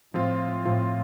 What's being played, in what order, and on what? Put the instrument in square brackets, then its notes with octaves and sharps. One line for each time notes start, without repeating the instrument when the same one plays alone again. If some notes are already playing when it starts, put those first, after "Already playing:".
[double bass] A2 [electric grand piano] F3 C4 F4
[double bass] A2 [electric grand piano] F3 C4 F4